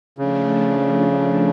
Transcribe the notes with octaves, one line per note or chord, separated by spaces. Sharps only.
C#3 F3 A3 D4